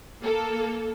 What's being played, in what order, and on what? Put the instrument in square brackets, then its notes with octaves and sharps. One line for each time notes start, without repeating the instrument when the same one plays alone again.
[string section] A#3 A4